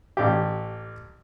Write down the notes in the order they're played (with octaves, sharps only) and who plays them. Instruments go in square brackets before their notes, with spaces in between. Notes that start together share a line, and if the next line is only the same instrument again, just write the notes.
[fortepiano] A1 G4